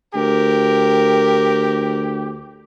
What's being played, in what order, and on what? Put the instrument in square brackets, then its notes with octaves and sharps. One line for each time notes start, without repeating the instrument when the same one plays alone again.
[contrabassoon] D2 [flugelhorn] G4 [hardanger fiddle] A#4